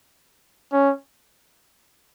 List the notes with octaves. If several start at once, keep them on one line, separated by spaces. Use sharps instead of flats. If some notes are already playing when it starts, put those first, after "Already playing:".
C#4